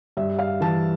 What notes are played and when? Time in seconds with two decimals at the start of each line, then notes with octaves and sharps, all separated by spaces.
0.17 G2 E5
0.39 F5
0.61 E3 A5